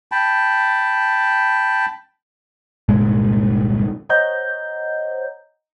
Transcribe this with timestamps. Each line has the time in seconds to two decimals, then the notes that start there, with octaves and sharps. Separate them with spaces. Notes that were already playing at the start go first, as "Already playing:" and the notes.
0.12 G5 A5 B5
2.89 G1 C2 A#2 G#3
4.09 C5 C#5 D#5 F#5 A#5 G6